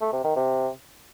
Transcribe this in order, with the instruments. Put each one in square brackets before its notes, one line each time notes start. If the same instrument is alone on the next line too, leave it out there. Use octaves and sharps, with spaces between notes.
[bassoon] A3
C3
D#3
C3